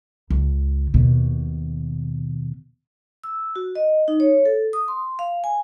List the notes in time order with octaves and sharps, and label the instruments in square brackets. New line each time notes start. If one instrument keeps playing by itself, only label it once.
[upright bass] C#2
D#2 B2
[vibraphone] E6
F#4
D#5
D#4
C#5
A4
D#6
C6
F5
G#5